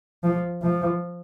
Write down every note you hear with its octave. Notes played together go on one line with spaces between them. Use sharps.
F3
F3